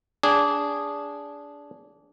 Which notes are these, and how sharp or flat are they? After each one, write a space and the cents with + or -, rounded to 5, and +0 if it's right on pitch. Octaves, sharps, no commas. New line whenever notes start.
D4 -20 G#4 -10